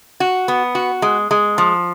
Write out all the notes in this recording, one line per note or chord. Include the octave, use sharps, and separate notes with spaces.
F#4
B3
F#4
G#3
G#3
F3